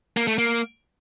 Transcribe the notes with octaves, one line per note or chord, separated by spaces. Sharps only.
A#3
A3
A#3